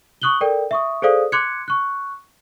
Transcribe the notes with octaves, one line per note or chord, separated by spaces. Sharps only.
C#6 D#6 F#6 F#7 G7
A4 A#4 D5 G5
E5 C#6 D#6
G#4 A4 C5 D5 F5 D#6
C6 D6 F#6 G#6 C#7
C#6 F#6